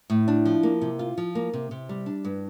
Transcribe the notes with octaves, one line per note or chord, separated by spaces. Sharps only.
A2
D4
F3
A#3
C3
F4
F3
A#3
C3
C3
G3
D4
G2